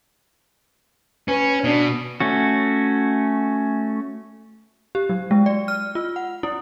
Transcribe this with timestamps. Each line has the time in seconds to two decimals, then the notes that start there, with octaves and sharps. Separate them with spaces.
1.28 C#4 B4
1.64 B2 D4
2.20 A3 C#4 F#4
4.95 G4
5.09 F#3
5.31 G#3
5.46 D5
5.68 F6
5.95 F4
6.16 F#5
6.43 E4